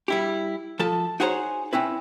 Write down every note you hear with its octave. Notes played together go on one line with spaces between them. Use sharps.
G3 E4 G4
F3 A4 A5
D#4 F#4 G#4 A#4 C5 C#5
C4 C#4 E4 B4